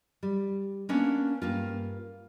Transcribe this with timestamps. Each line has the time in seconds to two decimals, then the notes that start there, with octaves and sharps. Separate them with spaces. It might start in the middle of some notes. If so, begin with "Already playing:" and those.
0.23 G3
0.89 A#3 B3 C#4 D4
1.42 G2 A#3 F4